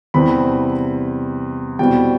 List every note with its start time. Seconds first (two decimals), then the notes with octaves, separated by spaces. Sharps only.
0.14 E2 C3 E3 G3 C4 B5
1.79 E2 B2 G3 C4 G5